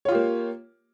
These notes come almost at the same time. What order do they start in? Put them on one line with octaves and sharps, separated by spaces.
C#5 F4 G4 A#3